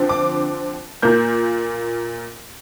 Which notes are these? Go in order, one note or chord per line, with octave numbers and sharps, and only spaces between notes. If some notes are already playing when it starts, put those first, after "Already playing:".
Already playing: D3 F3 C4
D6
A#2 A#3 G6